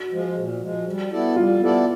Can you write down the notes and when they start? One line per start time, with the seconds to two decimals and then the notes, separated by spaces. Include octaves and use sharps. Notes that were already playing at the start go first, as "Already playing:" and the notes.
Already playing: F#4
0.12 F3 G#3
0.36 A#2
0.61 F3 G#3
0.85 G3
1.11 B3 E4 A4 D5
1.36 G3 F4
1.60 B3 E4 A4 D5